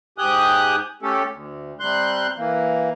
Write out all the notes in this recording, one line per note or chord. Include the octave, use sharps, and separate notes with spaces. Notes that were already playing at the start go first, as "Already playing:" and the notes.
G#2 G4 G#5 D#6 F#6 G6
A3 C#4 G4 A4
D2
C3 G3 C6 F#6 G6
E3 A#3